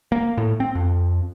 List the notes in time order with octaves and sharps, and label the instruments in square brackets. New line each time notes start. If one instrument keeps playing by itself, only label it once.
[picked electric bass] A#3
A2
C4
F2